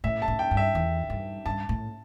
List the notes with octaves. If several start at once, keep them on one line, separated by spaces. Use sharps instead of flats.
A2 E5
A5
A2
G5
G2
E5
E2
G2
G2 A5
A2